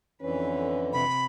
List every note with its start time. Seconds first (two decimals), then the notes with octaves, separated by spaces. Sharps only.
0.22 F2 D3 E3 C#4 B4
0.93 C3 B5